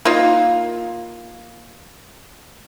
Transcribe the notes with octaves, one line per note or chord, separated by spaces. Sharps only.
A#3 D#4 F4